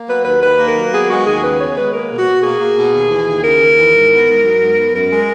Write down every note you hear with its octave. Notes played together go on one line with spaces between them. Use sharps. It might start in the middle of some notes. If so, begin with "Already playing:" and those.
Already playing: A#3
F#3 B4
D#2 B4
D#3 B4
A#3
A#4
F#3
B3 G#4
G#3 F#4
D#2 G#4
C#3 B4
B3 C#5
G#3 B4
A#3 A#4
B2
F#4
B2
A#3 G#4
A#3
B2
D#2
E3
D#2
C#3 A#4
D#2
E3
G#2
B3
G#2
F#3
G#2
B3
F#2 A#4
G#3